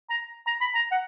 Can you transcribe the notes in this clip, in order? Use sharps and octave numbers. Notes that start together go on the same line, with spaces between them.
A#5
A#5
B5
A#5
F#5